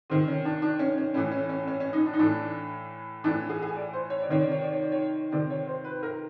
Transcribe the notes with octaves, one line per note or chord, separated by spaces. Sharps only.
C3 D#3 C4
C#4
D4
D4
C#4
C#4
A2 E3 C#4
C#4
C#4
C#4
C#4
D#4
D4
D#4
A2 E3 D4
A2 E3 D4
G#4
G#4
D5
C5
C#5
D5
C3 D#3 C#5
D5
C#5
D5
C#5
D5
C#5
C3 D#3 D5
C#5
C5
B4
A#4